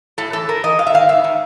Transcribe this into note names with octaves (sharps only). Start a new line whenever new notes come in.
A2 A4
E3 A4
A2 A#4
E3 D#5
G#2 F5
E5
D#3 F5
G#2 E5
D#3